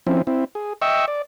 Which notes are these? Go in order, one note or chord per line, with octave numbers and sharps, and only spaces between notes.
F3 C4 C#4 E4
C4 E4
G#4
D#5 E5 G5 C#6 E6
D5